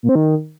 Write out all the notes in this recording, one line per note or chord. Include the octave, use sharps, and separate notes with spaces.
A#2
C4
D#3